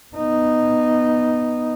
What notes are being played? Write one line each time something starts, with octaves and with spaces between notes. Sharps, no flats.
B3 D#4